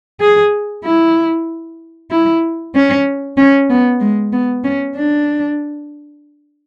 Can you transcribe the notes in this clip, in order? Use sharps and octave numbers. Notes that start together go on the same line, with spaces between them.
G#4
E4
E4
C#4
C#4
B3
G#3
B3
C#4
D4